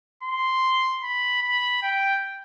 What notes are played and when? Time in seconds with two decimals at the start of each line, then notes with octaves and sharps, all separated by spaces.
0.23 C6
1.03 B5
1.43 B5
1.82 G5